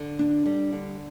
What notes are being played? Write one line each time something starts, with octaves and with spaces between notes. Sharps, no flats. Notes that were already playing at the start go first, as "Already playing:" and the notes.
Already playing: D3
D4
G3
D3